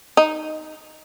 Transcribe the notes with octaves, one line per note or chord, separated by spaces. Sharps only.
D#4